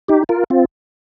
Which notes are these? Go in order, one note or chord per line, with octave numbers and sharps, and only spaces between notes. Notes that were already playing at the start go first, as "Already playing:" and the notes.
D#4 G4
F4 A#4
C4 F4